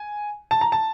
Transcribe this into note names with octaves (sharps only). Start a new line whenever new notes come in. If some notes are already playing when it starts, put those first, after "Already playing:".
Already playing: G#5
A5
A#5
A5